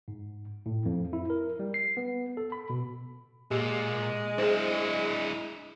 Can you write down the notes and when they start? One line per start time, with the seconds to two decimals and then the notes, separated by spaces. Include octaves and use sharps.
0.08 G#2
0.66 A2
0.85 F2
1.13 E4
1.30 A#4
1.59 G3
1.74 C7
1.97 B3
2.37 A4
2.52 B5
2.70 B2
3.51 A#2 G#3 G4
4.38 D4 E4 G#4 C5